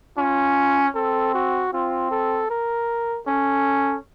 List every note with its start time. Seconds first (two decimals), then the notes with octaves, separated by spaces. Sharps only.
0.18 C#4 F4
0.95 C4 A4
1.34 F#4
1.73 C4 F4
2.11 A4
2.50 A#4
3.27 C#4 A4